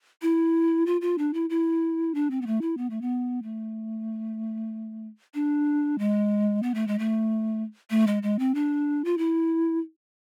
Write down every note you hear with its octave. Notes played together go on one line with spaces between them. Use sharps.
E4
F4
F4
D4
E4
E4
D4
C4
B3
A3
E4
B3
A3
B3
A3
D4
G#3
B3
A3
G#3
A3
A3
G#3
G#3
C4
D4
F4
E4